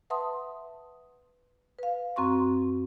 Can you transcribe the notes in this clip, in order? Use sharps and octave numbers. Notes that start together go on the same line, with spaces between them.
B4 E5 F#5 A5 C6 D#6
B4 F5
F#2 C4 F#4 C6 C#6